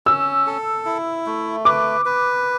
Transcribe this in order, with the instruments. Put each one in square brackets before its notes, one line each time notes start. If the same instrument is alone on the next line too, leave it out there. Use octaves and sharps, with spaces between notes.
[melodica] C#4 [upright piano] E6
[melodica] A4
E4
A3
[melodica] B4 [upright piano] D6
[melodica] B4